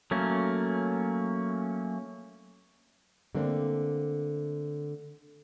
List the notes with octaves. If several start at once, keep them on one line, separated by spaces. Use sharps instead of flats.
F#3 A3 A#3 C#4
D3 A3 A#3 C4